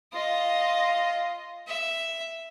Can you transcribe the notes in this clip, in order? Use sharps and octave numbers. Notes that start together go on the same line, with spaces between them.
F4 D#5
E5